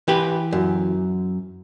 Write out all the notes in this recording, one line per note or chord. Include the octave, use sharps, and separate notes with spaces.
E3 G4 B4
F#2